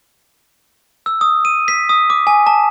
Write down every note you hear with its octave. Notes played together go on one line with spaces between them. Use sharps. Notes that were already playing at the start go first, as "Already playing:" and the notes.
E6
D#6
D#7
B6
D#6
D6
G#5
A5